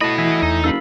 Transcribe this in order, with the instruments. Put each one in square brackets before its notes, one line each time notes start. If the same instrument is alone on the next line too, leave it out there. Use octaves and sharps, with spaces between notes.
[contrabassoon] A2 [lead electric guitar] F#4 B5 [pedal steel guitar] D#5 A5
[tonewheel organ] E3 [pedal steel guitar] D#5 E5 G#5
[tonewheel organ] E2 [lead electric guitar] D#4
[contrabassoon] F#1 [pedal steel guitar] A4 F5 B5